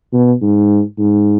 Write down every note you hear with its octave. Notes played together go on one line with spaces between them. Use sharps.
B2
G#2
G#2